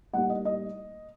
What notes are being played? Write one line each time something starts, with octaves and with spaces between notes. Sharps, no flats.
A2 G3 A#3 D#4 F#5
D#5
D#5